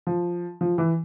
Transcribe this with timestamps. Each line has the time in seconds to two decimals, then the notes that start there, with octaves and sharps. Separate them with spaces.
0.07 F3
0.61 F3
0.78 E3